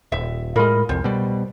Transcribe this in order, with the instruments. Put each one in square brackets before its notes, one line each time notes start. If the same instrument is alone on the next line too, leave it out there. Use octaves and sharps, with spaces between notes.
[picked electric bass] D#1 [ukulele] E5
[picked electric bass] A2 G#3 [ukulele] F4 A#4 B5
[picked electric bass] C2 F2 [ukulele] C5
[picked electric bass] B2 G3